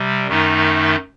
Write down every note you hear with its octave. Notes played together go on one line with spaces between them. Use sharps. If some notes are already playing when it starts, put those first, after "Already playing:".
Already playing: C3 G3
F#2 D#3 A3 D#4